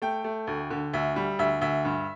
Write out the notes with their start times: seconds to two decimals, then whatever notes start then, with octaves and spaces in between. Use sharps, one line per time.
0.02 A3 G5
0.24 A3
0.47 D2
0.70 D3
0.93 D2 E5
1.16 G3
1.39 D2 E5
1.61 D2 E5
1.85 G2